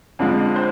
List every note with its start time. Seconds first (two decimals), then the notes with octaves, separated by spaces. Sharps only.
0.19 F2 D3 F3 G#3
0.56 C5